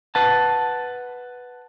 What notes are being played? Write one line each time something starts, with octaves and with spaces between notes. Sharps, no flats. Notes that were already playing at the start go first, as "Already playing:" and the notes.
B4 F#5 A5